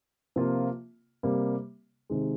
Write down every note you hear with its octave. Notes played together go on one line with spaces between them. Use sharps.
C3 F3 A#3 F4
C3 G3 A#3
C3 D#3 G#3